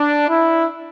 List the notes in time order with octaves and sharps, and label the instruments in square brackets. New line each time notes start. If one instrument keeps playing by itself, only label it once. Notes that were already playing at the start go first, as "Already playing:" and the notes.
Already playing: [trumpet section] D4
E4